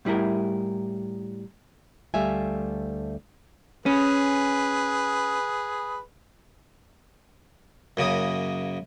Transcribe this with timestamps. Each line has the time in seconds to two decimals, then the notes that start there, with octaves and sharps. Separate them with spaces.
0.05 A2 G3 E4 G#4 A#4
2.14 D2 G3 A3 E5 F5 G#5
3.86 C#4 G#4 B4
7.97 F#2 C#3 A#3 D#6